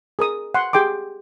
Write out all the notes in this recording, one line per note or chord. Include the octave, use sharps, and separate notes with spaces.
G#4 A#4 D#6
F#5 C6
G4 G#4 G5 C6 D6